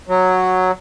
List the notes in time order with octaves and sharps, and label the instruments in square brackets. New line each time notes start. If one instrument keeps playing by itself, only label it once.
[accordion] F#3